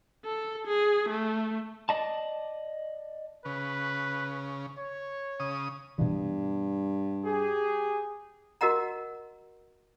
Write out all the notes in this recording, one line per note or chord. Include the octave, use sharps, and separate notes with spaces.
A4
G#4
A3
D5 D#5 A5
C#3 B4
C#5
C#3 D#6
G2 B2 E3
G4 G#4
F#4 A#4 D#5 F#5 A#5